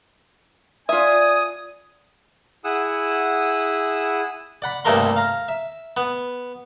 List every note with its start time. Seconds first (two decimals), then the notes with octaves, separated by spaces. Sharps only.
0.89 F4 D5 E5 G#5 D#6
2.64 E4 G#4 F#5 D#6 E6
4.62 D5 F#5 B5
4.85 C2 G2 A3 A#3 A#4 C6
5.16 F5 A#5
5.48 E5
5.97 B3